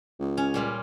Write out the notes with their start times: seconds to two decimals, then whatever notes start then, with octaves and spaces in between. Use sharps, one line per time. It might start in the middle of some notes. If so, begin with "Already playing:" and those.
0.19 C#2
0.37 C#4
0.54 A#2 G3 F4